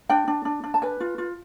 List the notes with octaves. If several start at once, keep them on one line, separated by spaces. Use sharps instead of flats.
D4 G5
D4
D4
D4
A5
B4 G#5
F4
F4